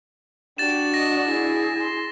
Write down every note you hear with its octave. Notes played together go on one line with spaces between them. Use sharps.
D4 F#4 G4 A6 E7
D#5 A#6
E4 G#4
C6